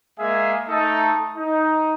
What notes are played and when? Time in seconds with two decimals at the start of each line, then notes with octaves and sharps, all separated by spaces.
0.19 G#3 A#3 G#4 E5 F5 G#5
0.69 A3 D#4 A4
1.37 D#4